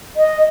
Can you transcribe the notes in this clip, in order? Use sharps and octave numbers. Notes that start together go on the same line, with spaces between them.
D#5